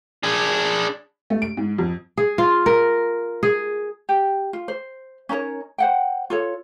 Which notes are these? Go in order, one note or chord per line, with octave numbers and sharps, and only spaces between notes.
D4 G#4
A3
D7
G#2
F2
G#4
F4
A#4
G#4
G4
F4
C5
C#4 D#4 A#4 C#5
C5 F#5 G5
F4 A4 C#5